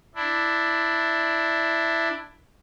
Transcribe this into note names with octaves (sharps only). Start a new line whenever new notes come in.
D4 E4